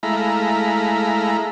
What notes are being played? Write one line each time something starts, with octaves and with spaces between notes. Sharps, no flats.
G#3 A3 E4 F5 A#5 B5